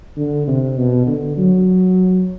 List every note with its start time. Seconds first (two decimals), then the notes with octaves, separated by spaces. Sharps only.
0.17 D3
0.47 C3
0.77 B2
1.07 D3
1.37 F#3